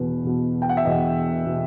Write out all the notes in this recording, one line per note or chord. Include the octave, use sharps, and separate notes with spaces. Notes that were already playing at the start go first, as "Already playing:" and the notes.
Already playing: E2 B2 B4
E2 B2
G5
F#5
E5
E2 B2 D#5
B2